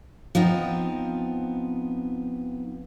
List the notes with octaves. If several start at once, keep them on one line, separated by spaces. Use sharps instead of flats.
F3 B3 C4 D#4